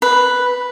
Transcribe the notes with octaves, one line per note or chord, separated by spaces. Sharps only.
B4